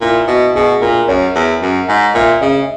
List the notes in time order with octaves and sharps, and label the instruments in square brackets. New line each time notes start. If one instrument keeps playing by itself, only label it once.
[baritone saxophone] A#2 [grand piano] E4
[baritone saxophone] B2 [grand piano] F#4
[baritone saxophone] B2 [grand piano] G#4
[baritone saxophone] A#2 [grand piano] A#4
[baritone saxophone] F#2 [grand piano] C#5
[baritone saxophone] E2
F#2
G#2
[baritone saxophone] A#2 [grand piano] E5
[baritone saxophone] C#3 [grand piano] D#5